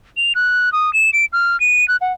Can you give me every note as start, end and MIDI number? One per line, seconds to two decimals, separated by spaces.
0.17 0.33 101
0.35 0.72 90
0.73 0.93 87
0.93 1.10 100
1.13 1.25 98
1.33 1.59 89
1.60 1.87 99
1.88 1.96 90
2.01 2.13 78